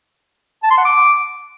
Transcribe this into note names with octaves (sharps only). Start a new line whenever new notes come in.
A5
C6
F#5
D6